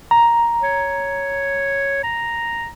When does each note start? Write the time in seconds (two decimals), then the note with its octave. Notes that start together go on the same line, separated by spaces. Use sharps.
0.11 A#5
0.63 C#5
2.04 A#5